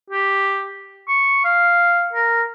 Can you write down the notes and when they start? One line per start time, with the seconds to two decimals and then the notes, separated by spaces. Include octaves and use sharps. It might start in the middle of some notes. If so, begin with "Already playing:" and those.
0.10 G4
1.08 C#6
1.45 F5
2.13 A#4